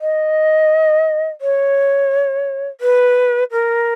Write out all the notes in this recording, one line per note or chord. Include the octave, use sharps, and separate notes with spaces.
D#5
C#5
B4
A#4